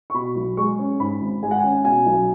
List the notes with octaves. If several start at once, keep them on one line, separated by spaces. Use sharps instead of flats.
C#6
B2 B5
B1
G#3 C#6
C#4
G#2 B5
G#1
G#3 G#5
F#5
G#5
C#4
B2 G#5
B1